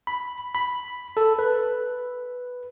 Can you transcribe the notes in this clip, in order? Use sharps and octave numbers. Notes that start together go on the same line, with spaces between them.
B5
B5
A4
B4